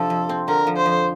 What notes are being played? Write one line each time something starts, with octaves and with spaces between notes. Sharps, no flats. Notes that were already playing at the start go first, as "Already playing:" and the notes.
Already playing: C3 F3 D4 A4
F2
C4
D3 A#4
F3
C5
F2